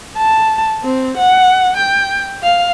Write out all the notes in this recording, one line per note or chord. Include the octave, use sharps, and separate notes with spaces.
A5
C4
F#5
G5
F5